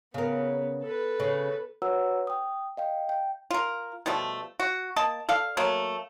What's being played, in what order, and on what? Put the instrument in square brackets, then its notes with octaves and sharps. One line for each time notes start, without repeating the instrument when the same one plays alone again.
[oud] C#3 A#4 [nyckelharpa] B3
[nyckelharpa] A4 B4
[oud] C#3
[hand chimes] F#4 B4 C#5 F#5 A#5 E6
G5 D#6
D#5 F5 G5
G5
[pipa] F4 A#4
B2 F3 G3 A3
F#4
A#3 D#5 A5
A4 D5 F5
F#3 A3 A#3